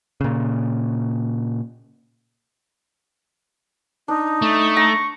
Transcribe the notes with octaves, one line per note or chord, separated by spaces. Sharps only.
A#2 C#3
D4 D#4
A3 C#6
A#5